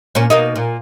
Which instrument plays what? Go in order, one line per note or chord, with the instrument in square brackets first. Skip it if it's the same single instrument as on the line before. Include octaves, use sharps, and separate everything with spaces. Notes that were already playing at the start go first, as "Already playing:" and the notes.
[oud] A#2 A#3 C#4
B2 A#3 D#4
A#2